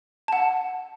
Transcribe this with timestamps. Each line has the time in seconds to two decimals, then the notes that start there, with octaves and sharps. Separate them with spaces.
0.28 F#5 A5